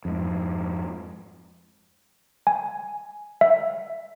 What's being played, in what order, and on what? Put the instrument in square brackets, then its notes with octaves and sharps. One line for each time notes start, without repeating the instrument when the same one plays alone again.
[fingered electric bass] F2 G#2
[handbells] G#5
E5